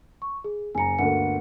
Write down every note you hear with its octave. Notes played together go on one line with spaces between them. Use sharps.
C#6
G#4
F#1 G#5 A#5 C#7
G1 D2 A#3 F#5 C#7